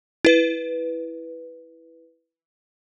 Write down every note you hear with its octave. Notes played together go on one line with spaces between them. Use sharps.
E4 B4